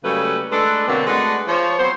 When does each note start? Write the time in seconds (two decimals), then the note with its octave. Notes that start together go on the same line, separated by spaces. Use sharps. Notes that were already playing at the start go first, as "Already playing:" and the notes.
0.04 C#3 F#3 G3 A3 A#3 B4
0.52 G#3 A3 D4 A4 B4
0.88 B2 D3 F#3 A#3 C4
1.07 G#3 A3 D4 F#4 G#4 B4
1.48 F3 C#5
1.78 F#3 B3 C4 C5